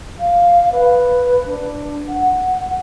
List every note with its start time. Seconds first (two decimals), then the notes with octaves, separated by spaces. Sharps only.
0.20 F5
0.72 B4
1.46 D4
2.09 F#5